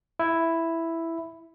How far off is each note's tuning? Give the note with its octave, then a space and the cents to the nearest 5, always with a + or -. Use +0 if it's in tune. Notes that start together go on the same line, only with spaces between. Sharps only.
E4 +0 E5 +0